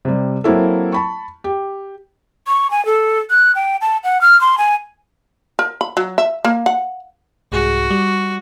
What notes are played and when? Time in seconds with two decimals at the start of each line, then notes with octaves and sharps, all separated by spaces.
0.05 C3 G3
0.44 F#3 A#3 C4 E4 A4
0.92 A5 B5 C#6
1.44 G4
2.47 C#6
2.71 G#5
2.86 A4
3.30 F#6
3.55 G5
3.81 A5
4.04 F#5
4.21 F6
4.41 C6
4.58 G#5
5.59 A#4
5.81 B5
5.97 F#3
6.18 E5
6.45 A#3
6.66 F#5
7.52 C2 G#2 F#4 G#4
7.91 G3